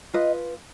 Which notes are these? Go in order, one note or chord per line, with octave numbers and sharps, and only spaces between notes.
F4 B4 D#5